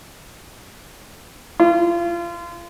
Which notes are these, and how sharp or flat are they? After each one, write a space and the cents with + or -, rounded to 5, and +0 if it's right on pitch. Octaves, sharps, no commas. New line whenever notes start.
F4 -30